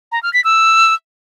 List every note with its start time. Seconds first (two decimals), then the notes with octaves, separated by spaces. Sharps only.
0.12 A#5
0.23 F6
0.33 B6
0.44 E6